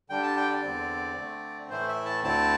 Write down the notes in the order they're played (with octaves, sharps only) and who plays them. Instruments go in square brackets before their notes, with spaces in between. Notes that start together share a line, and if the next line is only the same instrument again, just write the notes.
[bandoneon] D3 G3 D4 G5
A5
G5
D5
E2 D3 C4
D3 A3 C4
A2 E3 A3 E4 C5
E5
A5
D2 D3 C4 E4 A5